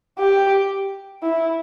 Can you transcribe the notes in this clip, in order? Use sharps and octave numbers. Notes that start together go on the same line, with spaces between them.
G4
E4